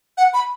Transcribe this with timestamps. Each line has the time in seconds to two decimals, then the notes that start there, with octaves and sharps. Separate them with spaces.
0.18 F#5
0.34 B5